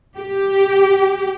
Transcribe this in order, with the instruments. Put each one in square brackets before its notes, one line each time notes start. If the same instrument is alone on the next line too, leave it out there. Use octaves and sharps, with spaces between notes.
[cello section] G4